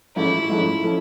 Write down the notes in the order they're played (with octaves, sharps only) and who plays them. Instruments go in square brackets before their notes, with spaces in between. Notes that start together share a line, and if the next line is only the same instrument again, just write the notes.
[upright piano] A1 G#2 F3 A3 C#4 [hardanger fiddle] E4
[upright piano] A1 G#2 F3 A3 C#4
F3 A3 C#4